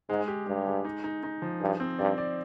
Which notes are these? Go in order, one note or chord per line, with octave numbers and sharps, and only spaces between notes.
G#2 G#3
G4
G2 G#3
G#3
D#4
D#4
D#4
F3
G2 G#4
C4
G2 D5
D5